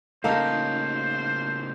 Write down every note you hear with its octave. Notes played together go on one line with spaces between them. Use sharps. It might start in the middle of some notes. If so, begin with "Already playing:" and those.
A2 C#3 A#3 C#4 D#4 A4 C5 F5